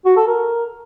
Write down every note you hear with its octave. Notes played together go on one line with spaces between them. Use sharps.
F#4
A4
A#4